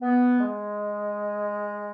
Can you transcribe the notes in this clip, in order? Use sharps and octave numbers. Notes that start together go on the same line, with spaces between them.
B3
G#3